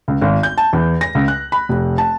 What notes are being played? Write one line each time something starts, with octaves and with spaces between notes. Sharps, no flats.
C#2
G#1
G6
A5
E2
A#6
C#2
F#6
B5
F1
A5